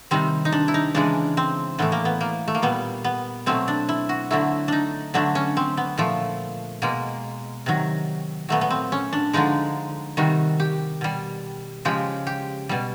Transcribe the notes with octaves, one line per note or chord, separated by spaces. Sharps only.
C3 D#3 G3 C4
D#4
D4
E4
D#4
C#3 E3 G#3 D4
C4
A2 E3 A3 B3
A#3
B3
A#3
A3
A#3
A#2 G3 B3
B3
B2 F#3 A3 C4
D4
E4
F#4
D3 F#3 A3 E4
D4 D#4
D3 F#3 A3 D4
C#4
C4
B3
A#2 F3 A3
B2 G#3 A#3
C3 D#3 F#3
A#2 F#3 A3 B3
B3
C4
C#4
D4
D3 F3 G#3 D#4
C3 D#3 G3 F#4
G4
B2 G3
C#3 F3 G#3 G4
G4
B2 G3